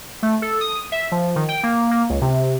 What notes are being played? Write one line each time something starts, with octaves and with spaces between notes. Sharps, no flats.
A3
A4
D#6
E5
F3
D#3
G5
A#3
A#3
C#2
C3